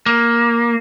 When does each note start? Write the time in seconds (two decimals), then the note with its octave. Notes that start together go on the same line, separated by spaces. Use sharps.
0.06 A#3